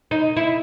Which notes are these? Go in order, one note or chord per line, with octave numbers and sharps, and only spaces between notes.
D#4
E4